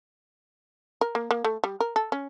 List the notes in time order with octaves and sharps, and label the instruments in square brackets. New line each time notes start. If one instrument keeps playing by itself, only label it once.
[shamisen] A#4
A#3
A#3
A3
G3
A#4
A4
C#4